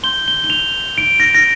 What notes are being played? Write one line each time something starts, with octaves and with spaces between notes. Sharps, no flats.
C6 G6 G7
G7
G7
F7
D7
A#6
A#6